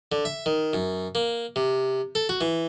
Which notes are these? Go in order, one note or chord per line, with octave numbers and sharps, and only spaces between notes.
D3
E5
D#3
F#2
A#3
C3
A4
F#4
E3